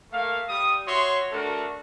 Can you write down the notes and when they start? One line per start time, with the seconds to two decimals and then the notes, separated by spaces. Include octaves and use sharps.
0.12 A3 A#3 E5 F5
0.49 G3 D#6
0.87 F#4 C#5 E5 C6
1.32 A3 D4 F#4 A4 A#4